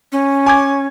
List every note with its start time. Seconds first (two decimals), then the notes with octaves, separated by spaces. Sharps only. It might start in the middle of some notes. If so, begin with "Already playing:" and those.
0.12 C#4
0.46 G#5 D6 G#6